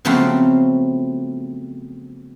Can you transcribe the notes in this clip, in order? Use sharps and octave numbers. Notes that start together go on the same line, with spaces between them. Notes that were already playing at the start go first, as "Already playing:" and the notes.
C#3 F3 F#3 A3 B3 C4